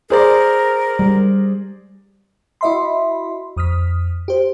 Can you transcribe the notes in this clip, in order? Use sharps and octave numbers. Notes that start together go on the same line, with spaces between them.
G#4 A#4 C5 D5
G3
E4 F#4 D#5 E5 B5 C6
F2 D#6 F6 B6
G4 C5